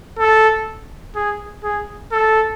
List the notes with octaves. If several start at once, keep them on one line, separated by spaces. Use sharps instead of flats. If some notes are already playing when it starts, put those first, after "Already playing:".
A4
G#4
G#4
A4